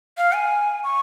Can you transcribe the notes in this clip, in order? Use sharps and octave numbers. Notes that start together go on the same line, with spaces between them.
F5
G#5
C#6